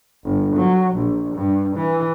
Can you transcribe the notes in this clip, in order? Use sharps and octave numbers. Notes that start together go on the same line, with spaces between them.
G1
F#3
A#1
G2
E3